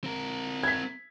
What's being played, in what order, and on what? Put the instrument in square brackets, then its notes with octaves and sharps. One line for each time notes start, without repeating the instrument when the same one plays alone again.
[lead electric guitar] C4 A#4
[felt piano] G#6 B6